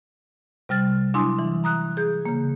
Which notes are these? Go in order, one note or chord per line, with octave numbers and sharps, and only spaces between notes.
C3 G3 F6 A6
F#3 D4 E4 G#5 C6 D#6
E3
A#5 D#6 F#6
G#4 G6
C#3 A#3